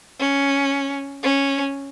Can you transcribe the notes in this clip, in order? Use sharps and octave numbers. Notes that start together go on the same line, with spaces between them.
C#4
C#4